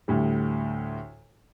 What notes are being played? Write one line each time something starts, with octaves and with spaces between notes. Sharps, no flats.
D2 A2 G3